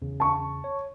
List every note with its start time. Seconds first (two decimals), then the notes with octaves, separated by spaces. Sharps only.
0.02 E2 C#3
0.20 A5 C#6
0.64 C#5